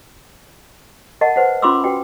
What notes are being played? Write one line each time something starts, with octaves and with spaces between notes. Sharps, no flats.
A#4 D#5 F#5 A5
B4 C5 F#5
C#4 F4 B5 C6 D6 E6
F#4 B4 G5 G#5